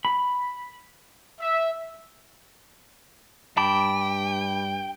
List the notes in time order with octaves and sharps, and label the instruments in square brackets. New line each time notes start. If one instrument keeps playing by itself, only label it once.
[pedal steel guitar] B5
[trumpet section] E5
[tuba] G2 [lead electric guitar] G5 [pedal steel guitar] A5 B5 D6